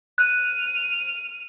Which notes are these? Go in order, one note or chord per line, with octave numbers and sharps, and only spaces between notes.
F6 F#6 D#7